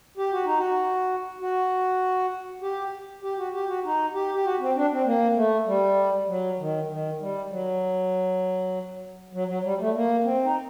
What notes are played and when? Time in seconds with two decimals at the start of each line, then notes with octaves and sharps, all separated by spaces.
0.17 G4
0.32 F#4
0.45 D#4
0.58 F#4
1.41 F#4
2.62 G4
3.23 G4
3.38 F#4
3.54 G4
3.69 F#4
3.85 D#4
4.14 G4
4.34 G4
4.45 F#4
4.60 C4
4.76 D4
4.92 C4
5.06 A#3
5.36 A3
5.67 G3
6.28 F#3
6.59 D#3
6.89 D#3
7.20 G3
7.51 F#3
9.33 F#3
9.48 F#3
9.63 G3
9.79 A3
9.95 A#3
10.24 C4
10.44 D#4